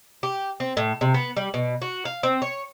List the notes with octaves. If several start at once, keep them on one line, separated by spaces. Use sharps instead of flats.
G4
C4
A2
C3
B3
G3
B2
F#4
F5
C4
C#5